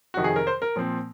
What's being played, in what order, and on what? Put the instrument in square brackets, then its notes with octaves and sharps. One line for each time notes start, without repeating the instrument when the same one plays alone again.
[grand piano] F2 C3 D#3 F#4
G#4
A#4
C5
A#4
A#2 F3 C4